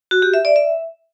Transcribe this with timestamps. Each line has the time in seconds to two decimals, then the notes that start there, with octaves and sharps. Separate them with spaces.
0.11 F#4
0.22 G4
0.34 E5
0.45 D5
0.56 E5